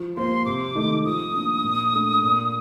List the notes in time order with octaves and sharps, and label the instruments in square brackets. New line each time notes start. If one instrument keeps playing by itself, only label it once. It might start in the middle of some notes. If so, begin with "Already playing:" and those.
Already playing: [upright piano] F3
[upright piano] A#3 F4 C5 [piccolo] C6
[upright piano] C3 [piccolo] D6
[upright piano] D#3 A3 D#4
[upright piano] F3 [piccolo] D#6
[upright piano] A#3 D4
A#2
A3 D4
A#2